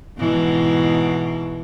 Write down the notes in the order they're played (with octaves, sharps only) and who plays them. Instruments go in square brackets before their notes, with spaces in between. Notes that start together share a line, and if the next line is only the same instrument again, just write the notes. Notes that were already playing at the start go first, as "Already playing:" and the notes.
[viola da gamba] G#2 B2 E3